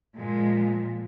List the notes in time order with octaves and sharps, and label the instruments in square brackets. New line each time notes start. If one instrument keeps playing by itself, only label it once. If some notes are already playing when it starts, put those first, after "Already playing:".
[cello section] A#2 F3 G#3